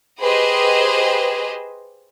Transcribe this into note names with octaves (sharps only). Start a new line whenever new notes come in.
G4 G#4 B4 C5 D#5